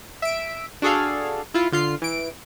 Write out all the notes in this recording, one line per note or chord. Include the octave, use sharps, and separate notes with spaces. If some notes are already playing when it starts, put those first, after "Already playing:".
E5 D7
D4 F#4 G#4 A4 F5
E4 F4
D3 F4 C7
E3 D7